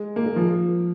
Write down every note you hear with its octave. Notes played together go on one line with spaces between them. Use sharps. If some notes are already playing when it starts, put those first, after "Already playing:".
Already playing: G#3
A#3
G#3
F3